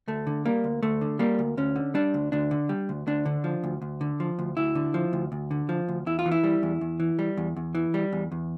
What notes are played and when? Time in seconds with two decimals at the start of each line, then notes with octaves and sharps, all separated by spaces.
0.08 D2 A3
0.27 D3
0.45 G3 A#3
0.64 D2
0.83 D2 A3
1.01 D3
1.19 G3 A#3
1.39 D2
1.57 D2 C#4
1.76 D3
1.94 G3 D4
2.14 D2
2.32 D2 D4
2.51 D3
2.69 G3
2.89 D2
3.07 D2 D4
3.26 D3
3.44 F3
3.64 D2
3.82 D2
4.01 D3
4.20 F3
4.39 D2
4.57 D2 E4
4.75 D3
4.94 F3
5.13 D2
5.32 D2
5.51 D3
5.69 F3
5.88 D2
6.06 E2 E4
6.19 F4
6.26 E3
6.32 E4
6.44 G3
6.63 E2
6.81 E2
7.00 E3
7.19 G3
7.37 E2
7.57 E2
7.75 E3
7.94 G3
8.13 E2
8.32 E2